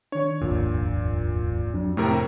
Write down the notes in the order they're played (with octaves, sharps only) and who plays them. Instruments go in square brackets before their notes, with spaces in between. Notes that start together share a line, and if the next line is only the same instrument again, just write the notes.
[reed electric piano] D#3 D4 [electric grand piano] C#5
[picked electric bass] D#1 G#1 F2 [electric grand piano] A#2
[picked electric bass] F2 [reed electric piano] F#3 D4
[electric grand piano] A2 C3 A#4 [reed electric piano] A3